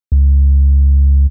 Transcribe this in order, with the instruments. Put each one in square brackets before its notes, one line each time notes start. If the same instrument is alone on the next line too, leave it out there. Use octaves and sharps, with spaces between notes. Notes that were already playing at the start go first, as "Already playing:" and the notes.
[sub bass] C#2